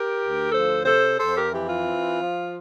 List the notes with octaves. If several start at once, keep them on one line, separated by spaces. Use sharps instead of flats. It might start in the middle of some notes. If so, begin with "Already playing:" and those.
Already playing: G4 A#4
D2
F3 A4 C5
C3 A4 C5
F2 A4 C5
G4 A#4
E3 G4
F4
C4
F3